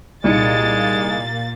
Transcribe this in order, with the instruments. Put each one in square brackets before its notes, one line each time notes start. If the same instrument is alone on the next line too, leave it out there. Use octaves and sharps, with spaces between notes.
[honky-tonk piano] C2 D#4 C#7 [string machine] A#2 [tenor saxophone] G#3 [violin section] A#3 A6